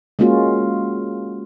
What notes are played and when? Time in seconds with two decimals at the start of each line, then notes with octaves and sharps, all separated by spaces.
0.19 G#3 A#3 C#4 F4 F#4